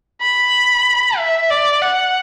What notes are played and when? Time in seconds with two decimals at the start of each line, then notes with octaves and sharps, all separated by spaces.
0.22 B5
1.18 E5
1.50 D5
1.82 F#5